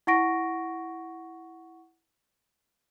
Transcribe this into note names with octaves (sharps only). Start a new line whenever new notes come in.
E4 F#5 C#6 A#6 D7